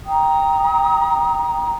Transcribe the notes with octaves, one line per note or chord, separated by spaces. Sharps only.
G5 A#5 D#6